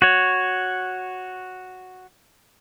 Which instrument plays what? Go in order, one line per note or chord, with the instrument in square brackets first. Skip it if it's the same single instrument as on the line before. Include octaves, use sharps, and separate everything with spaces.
[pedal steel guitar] F#4 C#5